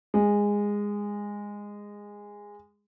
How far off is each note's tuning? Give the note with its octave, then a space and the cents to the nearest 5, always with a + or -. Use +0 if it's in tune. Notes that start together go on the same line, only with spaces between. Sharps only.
G#3 -15